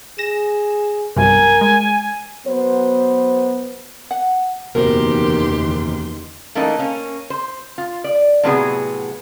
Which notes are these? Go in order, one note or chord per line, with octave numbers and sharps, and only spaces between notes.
G#4 A#6 E7
B1 G2 C3 A#4 G#5
G#3
F#3 B3 C5
F#5
F#1 E2 B2 D#3 G4 A#4 C5 C6
E3 A3 A#3 C#4 D#4
A#3 C#4
C5
F4
D5
A2 C3 F#3 B3 D#4 G#4